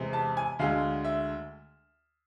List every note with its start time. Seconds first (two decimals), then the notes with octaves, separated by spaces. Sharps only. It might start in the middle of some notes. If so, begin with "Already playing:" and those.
Already playing: E2 C3 G#3
0.13 A5
0.37 G#5
0.59 D2 D3 G#3 F5
1.04 E5